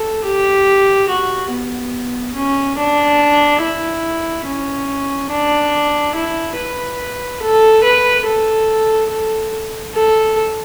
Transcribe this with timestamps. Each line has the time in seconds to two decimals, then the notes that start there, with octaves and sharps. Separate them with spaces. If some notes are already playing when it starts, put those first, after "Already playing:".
Already playing: A4
0.24 G4
1.09 F#4
1.51 B3
2.35 C#4
2.78 D4
3.62 E4
4.46 C#4
5.30 D4
6.15 E4
6.57 B4
7.42 A4
7.83 B4
8.26 A4
9.10 A4
9.94 A4